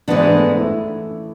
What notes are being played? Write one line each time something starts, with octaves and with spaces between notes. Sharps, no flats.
G#2 E3 G#3 B3 D4
A3
E4